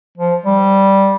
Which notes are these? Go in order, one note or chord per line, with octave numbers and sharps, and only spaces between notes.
F3
G3